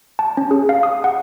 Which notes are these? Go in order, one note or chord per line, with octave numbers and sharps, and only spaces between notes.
A5
C#4
G#4
F5
D#6
F#5